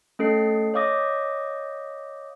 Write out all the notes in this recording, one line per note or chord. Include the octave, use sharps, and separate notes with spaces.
A3 C#4 A4 D#5 C7
C#5 D#5 F5 D6 D#6 A#6